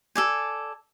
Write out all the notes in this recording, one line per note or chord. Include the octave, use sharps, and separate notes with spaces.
A4 D5 G#5